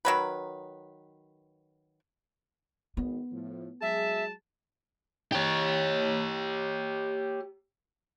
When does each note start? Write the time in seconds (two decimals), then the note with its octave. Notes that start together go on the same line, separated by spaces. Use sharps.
0.05 D#3 F#3 B4
2.97 G#1 B3
3.31 A2 F3
3.82 F#3 G#3 G#4 E5 A5
5.32 G4 C#5